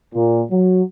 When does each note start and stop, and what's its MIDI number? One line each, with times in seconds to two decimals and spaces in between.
0.15 0.42 46
0.51 0.82 54